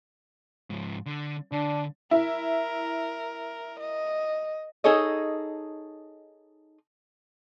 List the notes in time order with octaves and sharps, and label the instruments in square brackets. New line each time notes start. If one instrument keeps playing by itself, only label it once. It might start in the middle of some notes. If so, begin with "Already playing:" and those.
[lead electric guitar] G#2 F3
D3
[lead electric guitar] D3 [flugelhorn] D4
[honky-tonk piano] E4 [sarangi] A#4
[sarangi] D#5
[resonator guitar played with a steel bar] D#4 G#4 A4 C#5 D#5